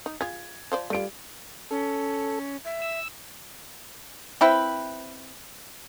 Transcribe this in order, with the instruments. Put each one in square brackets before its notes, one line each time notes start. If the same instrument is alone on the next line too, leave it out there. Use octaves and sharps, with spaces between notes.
[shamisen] D#4
[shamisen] F4 G#4 [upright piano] G#6
[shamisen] F3 C5 D5
[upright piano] G3 D7 [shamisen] A3 F4
[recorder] C#4 [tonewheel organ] A4
[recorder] E5
[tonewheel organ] E6
[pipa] C4 E4 B4 G5